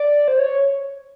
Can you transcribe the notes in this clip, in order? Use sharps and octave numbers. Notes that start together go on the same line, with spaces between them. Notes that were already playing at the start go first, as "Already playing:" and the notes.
Already playing: D5
C5
C#5